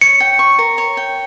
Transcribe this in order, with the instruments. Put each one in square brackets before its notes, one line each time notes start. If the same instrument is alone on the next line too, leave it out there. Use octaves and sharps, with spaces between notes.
[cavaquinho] C#5 [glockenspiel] C#7
[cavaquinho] G5
C#6
A#4
C#5
G5